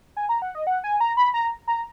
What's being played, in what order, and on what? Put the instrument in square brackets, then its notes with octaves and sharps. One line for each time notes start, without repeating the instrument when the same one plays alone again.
[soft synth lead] G#5
A#5
F#5
D#5
F#5
G#5
A#5
B5
A#5
A#5